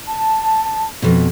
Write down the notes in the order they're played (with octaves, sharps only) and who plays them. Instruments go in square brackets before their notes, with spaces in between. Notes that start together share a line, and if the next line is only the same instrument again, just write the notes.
[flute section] A5
[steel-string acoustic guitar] F2 B2